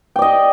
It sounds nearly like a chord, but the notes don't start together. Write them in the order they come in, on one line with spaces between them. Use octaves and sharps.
G5 D5 D#5